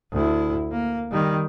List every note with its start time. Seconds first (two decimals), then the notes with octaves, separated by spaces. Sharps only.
0.12 D2 E4
0.71 A#3
1.11 D#3 G3